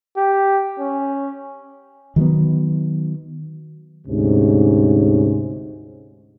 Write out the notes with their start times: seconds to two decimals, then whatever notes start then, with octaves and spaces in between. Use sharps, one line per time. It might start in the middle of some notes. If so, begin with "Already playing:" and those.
0.16 G4
0.79 C#4
2.16 D#3 F#3 G3 B3
4.07 D2 G#2 C3 C#4